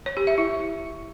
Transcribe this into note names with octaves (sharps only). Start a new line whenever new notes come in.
C#5
G4
E5
E4